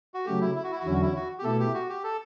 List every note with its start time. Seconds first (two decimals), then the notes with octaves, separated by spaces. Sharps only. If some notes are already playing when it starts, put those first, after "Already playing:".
0.14 F#4
0.26 C#3 F#3 A3 G4
0.41 E4
0.55 E4
0.64 F#4
0.72 E4
0.79 F#4
0.85 E2 D3 F#3 C#4 E4
0.94 F#4
1.02 E4
1.15 F#4
1.39 G4
1.44 B2 A3 E4 A4
1.59 G4
1.74 F#4
1.89 G4
2.04 A4